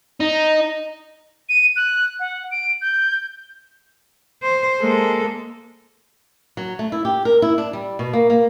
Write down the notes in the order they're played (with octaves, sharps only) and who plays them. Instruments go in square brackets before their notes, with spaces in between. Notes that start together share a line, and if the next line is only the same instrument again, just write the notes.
[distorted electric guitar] D#4
[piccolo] D#7
F#6
F#5
D7
G6
[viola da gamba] C5
G#3 A#3 A4
[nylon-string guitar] F#3
A3
E4
G4
A#4
E4
D4
G3
B2
A#3
A#3